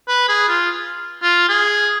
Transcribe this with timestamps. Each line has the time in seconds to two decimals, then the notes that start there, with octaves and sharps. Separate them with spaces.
0.08 B4
0.28 G#4
0.49 F4
1.23 F4
1.49 G#4